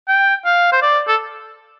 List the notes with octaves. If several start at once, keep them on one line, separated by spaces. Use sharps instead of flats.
G5
F5
C5
D5
A4